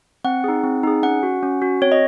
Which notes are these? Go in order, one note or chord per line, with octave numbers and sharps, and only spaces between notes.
C4 F#5
D#4 G#4
C4
D#4 G#4
C#4 F#5
F#4
C#4
F#4
C4 C#5
D#5